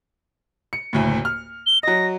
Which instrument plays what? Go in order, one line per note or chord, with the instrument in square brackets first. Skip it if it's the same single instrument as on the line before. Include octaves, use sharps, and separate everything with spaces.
[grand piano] C#7
F#1 D2 A2
F6
[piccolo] G7
[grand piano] F#3 D#5 [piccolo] A#6